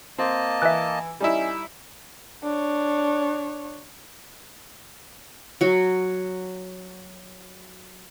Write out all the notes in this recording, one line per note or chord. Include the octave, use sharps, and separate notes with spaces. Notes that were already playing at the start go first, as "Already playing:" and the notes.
A#3 C4 D#5 A5
E3 E5 F#6
G3 C#4 D#4 E4
D4 C#5
F#3 F#4